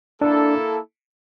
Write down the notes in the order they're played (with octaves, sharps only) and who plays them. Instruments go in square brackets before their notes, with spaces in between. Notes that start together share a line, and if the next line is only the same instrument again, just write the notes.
[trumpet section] A#3 E4 A4 [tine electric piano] D4